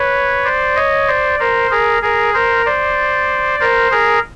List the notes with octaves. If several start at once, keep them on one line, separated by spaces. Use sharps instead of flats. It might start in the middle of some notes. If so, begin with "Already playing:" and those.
Already playing: B4 C#5
C5 D5
C#5 D#5
C5 D5
A#4 C5
G#4 A#4
G#4 A#4
A#4 C5
C5 D5
A#4 C5
G#4 A#4